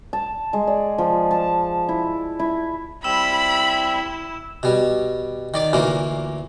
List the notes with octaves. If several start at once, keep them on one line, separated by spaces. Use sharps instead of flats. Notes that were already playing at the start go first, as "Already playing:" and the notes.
A5
G#3
D5
F3
A5
E4
E4
G3 C4 E4 B5 E6 E7
B2 G3
D#3 D5 D6
D2 A#2 E3 A#3